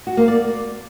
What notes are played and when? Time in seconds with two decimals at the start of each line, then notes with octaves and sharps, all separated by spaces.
0.07 F#4
0.17 A#3
0.28 D5